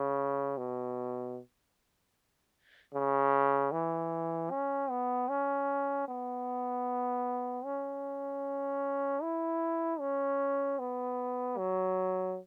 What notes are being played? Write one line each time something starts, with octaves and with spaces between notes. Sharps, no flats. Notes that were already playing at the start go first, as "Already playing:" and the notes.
Already playing: C#3
B2
C#3
E3
C#4
B3
C#4
B3
C#4
E4
C#4
B3
F#3